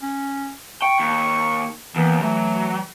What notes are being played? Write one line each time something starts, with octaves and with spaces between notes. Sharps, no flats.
C#4
G5 C#6
D#2
D#2 E3 B3
E3 F#3 A3